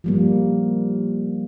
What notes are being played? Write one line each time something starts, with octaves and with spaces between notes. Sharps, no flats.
F3 G3 A#3